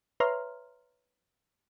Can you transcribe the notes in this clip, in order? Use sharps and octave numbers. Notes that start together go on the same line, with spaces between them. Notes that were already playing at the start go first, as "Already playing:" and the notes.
B4 C#5 E5 A#5 C6 F6